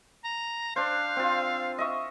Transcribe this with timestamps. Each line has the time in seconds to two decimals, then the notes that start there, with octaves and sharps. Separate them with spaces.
0.24 A#5
0.76 D4 C5 F5
1.17 C4 F4
1.78 D#5 E5 C#6